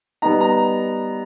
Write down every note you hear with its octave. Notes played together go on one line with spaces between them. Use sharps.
G3 B3 D#4 A#5
A#5